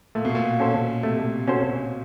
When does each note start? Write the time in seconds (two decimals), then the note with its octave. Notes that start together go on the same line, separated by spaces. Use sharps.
0.15 A#2 A3
0.25 B2
0.35 A#2
0.60 C#4 F#4 A4 C5
1.03 C3 A3
1.47 B2 C#4 F#4 A4 C5